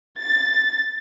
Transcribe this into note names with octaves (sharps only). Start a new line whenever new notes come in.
A6